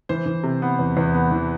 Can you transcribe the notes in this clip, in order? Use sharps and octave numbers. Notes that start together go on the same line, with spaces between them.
E3 C5
E3
C3
B3
E2
E2
B3
E3